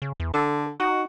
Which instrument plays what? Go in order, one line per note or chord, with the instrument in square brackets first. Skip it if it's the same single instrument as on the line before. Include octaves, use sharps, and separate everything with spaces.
[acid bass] C#3
E2
[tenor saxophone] D3 [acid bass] A4
[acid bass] D#4 [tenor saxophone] F#4